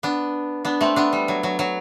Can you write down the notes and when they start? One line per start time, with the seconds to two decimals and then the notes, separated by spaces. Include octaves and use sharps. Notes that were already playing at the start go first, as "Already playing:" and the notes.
0.03 B3 D4
0.65 B3 D4
0.81 A3 C4
0.96 B3 D4
1.13 G3
1.28 F#3
1.43 F#3
1.59 F#3